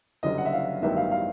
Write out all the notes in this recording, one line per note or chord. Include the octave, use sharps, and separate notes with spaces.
F#1 F#2 D3 G3 D#5
F#5
E5
F5
A1 G2 D#3 F#3 B3 E5
F5
F5